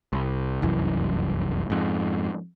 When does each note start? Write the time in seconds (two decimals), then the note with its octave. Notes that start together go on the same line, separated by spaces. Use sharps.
0.13 C2
0.62 F1 C2 F#2 E3
1.70 F2 G#2